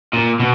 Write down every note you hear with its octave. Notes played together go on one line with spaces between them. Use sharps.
A#2
B2